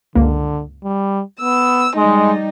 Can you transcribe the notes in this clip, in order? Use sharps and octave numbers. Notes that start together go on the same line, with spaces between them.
C#2 G2 D3 A#3
G3
B3 E6
G3 G#3 D#4